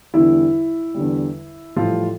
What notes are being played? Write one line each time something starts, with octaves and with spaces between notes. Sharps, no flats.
E2 D3 G3 E4
E2 D3 G3
A2 E3 F3 G3 F4